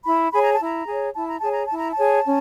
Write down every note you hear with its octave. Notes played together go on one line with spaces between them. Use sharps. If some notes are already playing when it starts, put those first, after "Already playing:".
E4 B5
G#4 C#5 B5
A#5
A5
E4 A#5
G#4 C#5
E4 A5
A#5
G#4 C#5 A5
A#5
E4 A5
A#5
A5
G#4 C#5
C#4